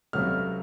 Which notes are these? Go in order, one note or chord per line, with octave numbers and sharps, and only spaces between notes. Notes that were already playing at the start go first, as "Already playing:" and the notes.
C#2 C3 F#3 A3 F6